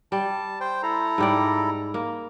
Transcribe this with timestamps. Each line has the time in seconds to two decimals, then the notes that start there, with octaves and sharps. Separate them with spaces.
0.12 G3 A5
0.61 C5 G5
0.83 E4 A4 A#5
1.18 G#2 G3 D5
1.94 A#3